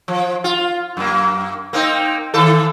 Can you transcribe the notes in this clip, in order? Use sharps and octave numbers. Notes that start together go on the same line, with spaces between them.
F3
F4
F#2 A#3
A#3 C4 D#4
D#3 E3 A4